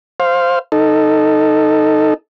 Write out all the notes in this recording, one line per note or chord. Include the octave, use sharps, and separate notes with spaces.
C5 F5
D#4 A4